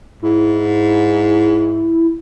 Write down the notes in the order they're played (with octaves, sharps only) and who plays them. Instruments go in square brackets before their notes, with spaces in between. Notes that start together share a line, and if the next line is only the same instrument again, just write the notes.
[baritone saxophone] G#2 [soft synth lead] E4